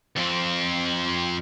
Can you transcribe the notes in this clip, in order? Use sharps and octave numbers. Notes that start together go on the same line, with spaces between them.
F2 C4